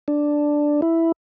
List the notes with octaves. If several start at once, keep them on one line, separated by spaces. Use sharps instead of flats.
D4
E4